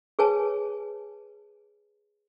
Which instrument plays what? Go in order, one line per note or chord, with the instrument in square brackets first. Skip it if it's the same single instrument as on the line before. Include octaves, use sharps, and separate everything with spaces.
[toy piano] G#4 B4 C#5 G#5 A5